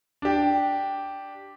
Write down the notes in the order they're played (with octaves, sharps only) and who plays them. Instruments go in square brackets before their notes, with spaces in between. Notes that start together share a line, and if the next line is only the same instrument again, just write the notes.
[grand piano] D4 G4